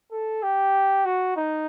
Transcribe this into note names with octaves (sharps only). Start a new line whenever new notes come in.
A4
G4
F#4
D#4